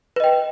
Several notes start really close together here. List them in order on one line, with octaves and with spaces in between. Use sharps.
B4 D#5 G5